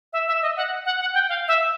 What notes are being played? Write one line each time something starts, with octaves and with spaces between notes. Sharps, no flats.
E5
E5
D#5
F#5
F#5
F#5
G5
F5
E5